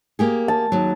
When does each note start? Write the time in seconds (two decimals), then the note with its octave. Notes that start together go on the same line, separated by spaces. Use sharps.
0.19 A#3 G4 G#4
0.48 A5
0.72 D#2 F#3